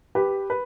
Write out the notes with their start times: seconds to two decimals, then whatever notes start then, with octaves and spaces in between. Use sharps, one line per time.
0.15 G4 B4
0.50 B4